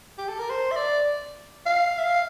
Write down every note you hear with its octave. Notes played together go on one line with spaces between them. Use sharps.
G4
A4
A#4
C5
E5
D5
F5
E5
F5